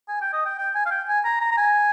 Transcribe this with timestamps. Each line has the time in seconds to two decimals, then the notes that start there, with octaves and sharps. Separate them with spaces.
0.08 G#5
0.21 G5
0.33 D#5
0.45 G5
0.58 G5
0.75 G#5
0.86 F5
0.91 G5
1.08 G#5
1.25 A#5
1.41 A#5
1.51 A#5
1.57 G#5